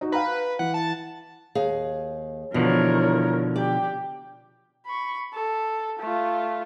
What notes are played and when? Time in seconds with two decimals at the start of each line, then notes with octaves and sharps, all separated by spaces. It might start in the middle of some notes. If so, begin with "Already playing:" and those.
0.01 D#4 F#4
0.12 B4 F5 G5 A#5
0.59 E3 F#5
0.74 A5
1.55 D#2 G#4 F5
2.54 B2 D3 E3 F3 A#4 C#5
3.56 G4 D5 G5
4.86 B5 C#6
5.33 A4
5.99 A3 F4